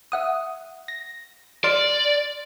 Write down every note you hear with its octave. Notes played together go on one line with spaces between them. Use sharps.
E5 F#5 D#6
A#6
D5 C6 F6 A6